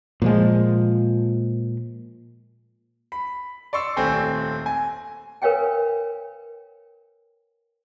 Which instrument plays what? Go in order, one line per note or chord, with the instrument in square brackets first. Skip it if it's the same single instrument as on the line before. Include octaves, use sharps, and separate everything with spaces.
[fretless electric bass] A#2 F3 G#3
[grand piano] B5
D5 C6 C#6 E6
D#1 A3 C4 G5 G#5 C6
G#5
[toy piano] A#4 B4 C#5 F5 G5 G#5